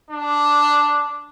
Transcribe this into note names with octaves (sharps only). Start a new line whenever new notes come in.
D4